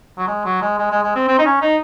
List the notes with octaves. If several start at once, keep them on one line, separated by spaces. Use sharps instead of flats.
F#3
G#3
F#3
G#3
G#3
G#3
G#3
C4
C4
D#4
C#4
D#4